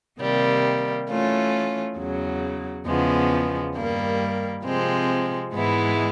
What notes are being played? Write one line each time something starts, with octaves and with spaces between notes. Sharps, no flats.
C3 D#3 G3 A#3
E3 A3 C#4 F4
E2 C#3 F#3
E2 C#3 F3 G#3 B3
G2 D#3 G3 A#3
C3 F3 G#3 C4
G#2 E3 G#3 B3 E4